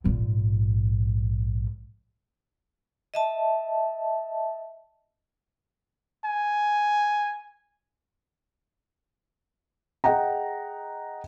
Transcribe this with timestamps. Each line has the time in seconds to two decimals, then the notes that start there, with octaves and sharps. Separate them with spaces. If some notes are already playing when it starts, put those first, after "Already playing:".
0.04 A#1 G#2
3.14 D#5 E5 A5
6.25 G#5
10.04 G#4 D#5 F#5 G5 A#5